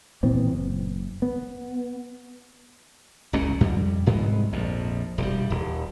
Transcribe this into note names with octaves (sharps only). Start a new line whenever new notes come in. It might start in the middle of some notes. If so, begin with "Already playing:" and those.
A#2 E3 B3 C4
F#1
B3
F#1 C#2 A#2 C#4
F2 G3
C2 G#2 G#3 B3
A#1 F2
E1 B2 G3
D#1